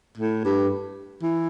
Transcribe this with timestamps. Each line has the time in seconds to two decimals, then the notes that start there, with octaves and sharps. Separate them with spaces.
0.18 A2
0.45 G2
1.22 E3